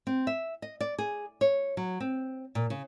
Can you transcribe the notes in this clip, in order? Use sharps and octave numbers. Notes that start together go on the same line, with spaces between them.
C4
E5
D#5
D5
G#4
C#5
F#3
C4
A#2
C#3